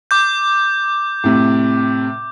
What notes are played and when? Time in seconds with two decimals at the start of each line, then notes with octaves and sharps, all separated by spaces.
0.11 D6 G6
1.24 A2 C3